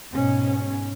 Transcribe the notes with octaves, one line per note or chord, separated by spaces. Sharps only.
G#2 B2 C#4